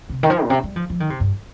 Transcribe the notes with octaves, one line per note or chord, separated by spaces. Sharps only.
C3
D#3
F3
A#2
C3
G3
F3
F3
D#3
C3
G2